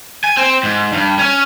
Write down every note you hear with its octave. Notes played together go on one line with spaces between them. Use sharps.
G#5
C4
G#2
G2
C#4